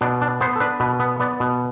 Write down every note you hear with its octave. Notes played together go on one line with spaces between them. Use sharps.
B2 D4
D4
B3 C5
A4
D4 B4
B2 B4
B3
B3 D5
B2